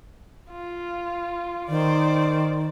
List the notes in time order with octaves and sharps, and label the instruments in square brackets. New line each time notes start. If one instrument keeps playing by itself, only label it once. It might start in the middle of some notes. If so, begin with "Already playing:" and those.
[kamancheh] F4
[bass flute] D#3 [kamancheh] C5 D5